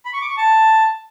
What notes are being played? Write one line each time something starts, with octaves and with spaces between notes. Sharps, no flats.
B5
C#6
D6
C#6
A5